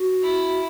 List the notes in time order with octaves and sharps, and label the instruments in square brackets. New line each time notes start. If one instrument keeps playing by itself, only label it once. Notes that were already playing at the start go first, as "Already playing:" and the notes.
Already playing: [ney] F#4
[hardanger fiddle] E4